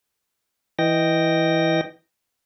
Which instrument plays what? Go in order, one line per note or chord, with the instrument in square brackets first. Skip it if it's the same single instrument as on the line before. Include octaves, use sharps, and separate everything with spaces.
[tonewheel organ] E3 D#5 G5 A#6